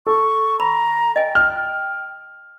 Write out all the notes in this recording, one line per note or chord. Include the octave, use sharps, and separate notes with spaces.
A4 C#6
A#5 B5
D#5 G5 G#5
F6